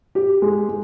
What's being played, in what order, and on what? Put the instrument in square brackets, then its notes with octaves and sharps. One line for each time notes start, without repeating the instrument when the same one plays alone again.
[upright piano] G4
G#3
G#3